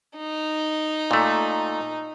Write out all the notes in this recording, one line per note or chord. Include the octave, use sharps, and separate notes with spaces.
D#4
A#2 A3